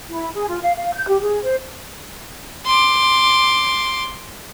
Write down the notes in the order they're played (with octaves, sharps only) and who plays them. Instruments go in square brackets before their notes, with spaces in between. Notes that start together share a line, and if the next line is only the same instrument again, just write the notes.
[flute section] E4
G#4
F4
F5
F5
G6
G4
G#4
C5
[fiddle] C6 D6